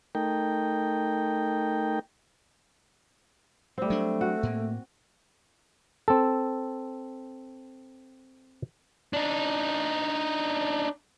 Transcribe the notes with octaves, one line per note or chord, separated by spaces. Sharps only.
A3 D#4 A#4 G5
G3 A3 C4
F#3 D4
F#4
A2 A#3
C4 A4
D4 D#4